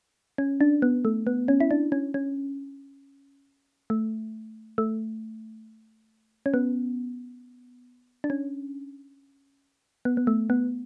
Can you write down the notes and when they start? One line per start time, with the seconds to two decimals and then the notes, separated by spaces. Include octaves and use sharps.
0.38 C#4
0.61 D4
0.82 B3
1.05 A3
1.27 B3
1.48 C#4
1.60 E4
1.71 D4
1.92 C#4
2.14 C#4
3.90 A3
4.78 A3
6.46 C#4
6.54 B3
8.24 D4
8.30 C#4
10.05 B3
10.17 B3
10.27 A3
10.50 B3